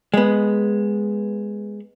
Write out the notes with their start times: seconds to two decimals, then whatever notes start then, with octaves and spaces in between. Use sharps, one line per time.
0.14 G#3 B3